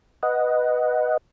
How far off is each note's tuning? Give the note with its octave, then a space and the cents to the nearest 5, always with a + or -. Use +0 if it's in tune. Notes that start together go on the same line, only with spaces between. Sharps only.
B4 +0 D#5 +0 F#5 +0